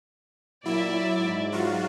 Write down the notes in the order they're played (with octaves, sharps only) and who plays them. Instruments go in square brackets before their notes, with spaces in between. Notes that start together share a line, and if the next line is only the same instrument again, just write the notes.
[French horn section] A#2 [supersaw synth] F#3 E4 [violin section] D5 E5
[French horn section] G#2
[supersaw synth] F#3 F4 F#4